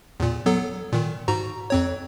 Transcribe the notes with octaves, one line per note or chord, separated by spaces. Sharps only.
E2 A#2
F#3 B3 A4
A#2 D#3
G#2 F#4 A#5
F2 C4 C#5